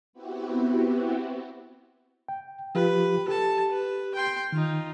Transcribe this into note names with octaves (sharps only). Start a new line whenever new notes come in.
B3 C4 E4 F#4 G4
G5
F3 F4 G4 B4
G4 A4 A5
B4
G5 C6
D#3 D#4 F4